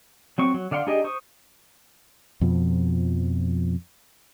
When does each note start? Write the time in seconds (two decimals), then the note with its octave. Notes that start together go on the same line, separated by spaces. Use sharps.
0.38 F#3 C4 C#6
0.54 F#3
0.71 D3 D5 F5 F#5 C6
0.87 D4 D#4 G4 G#4 D#5
1.04 C5 C#6 D#6
2.41 F2 B2 F3